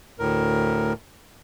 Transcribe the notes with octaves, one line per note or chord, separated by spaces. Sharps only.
D2 A2 A#4